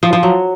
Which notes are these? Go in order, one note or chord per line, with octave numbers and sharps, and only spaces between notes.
F3
F3
F#3